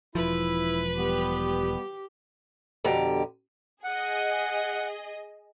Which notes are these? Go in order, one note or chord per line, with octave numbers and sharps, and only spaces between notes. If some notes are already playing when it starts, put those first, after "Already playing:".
E1 F3 E4 B4
G3 B3 G4
F2 B2 D3 G4 A#5
G#4 D#5 F#5